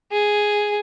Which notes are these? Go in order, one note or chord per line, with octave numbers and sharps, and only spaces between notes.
G#4